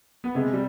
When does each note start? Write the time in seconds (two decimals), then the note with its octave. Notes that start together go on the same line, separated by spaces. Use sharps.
0.24 B3
0.35 C3 G#3
0.53 G3